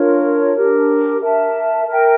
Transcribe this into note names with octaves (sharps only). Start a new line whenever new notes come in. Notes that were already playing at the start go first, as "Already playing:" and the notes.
Already playing: D4 F4 A#4 C#5
D4 G4 A#4
A#4 E5 A5
A#4 E5 G5